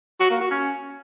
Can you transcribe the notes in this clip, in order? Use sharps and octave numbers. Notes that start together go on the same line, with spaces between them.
F#4
A#3
F#4
C#4